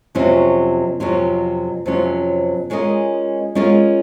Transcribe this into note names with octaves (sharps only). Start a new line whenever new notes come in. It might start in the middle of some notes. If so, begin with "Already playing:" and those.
F2 C3 F#3 C#4 F4
F2 C3 F#3 C#4 F4
F2 C3 F#3 C#4 F4
G#3 C#4 F4 A#4 D#5
G#3 C#4 F4 A#4 D#5